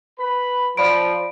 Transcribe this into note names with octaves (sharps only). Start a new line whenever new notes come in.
B4 B5
F3 D5 B5 D7